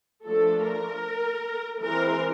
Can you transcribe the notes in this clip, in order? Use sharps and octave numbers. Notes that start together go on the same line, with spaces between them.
F3 A3 D4 A4
A#4
E3 G#3 C4 A#4